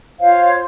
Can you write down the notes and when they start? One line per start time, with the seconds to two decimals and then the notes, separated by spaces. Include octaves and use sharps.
0.18 F4 C5 C#5 F5